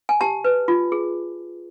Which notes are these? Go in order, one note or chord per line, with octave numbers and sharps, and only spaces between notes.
G#5
G4 A5
B4
F4
G#4